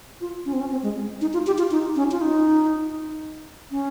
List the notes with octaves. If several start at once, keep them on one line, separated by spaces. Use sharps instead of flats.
F4
C#4
C4
C#4
C4
G#3
D#4
F4
G4
F4
D#4
C#4
F4
D#4
C#4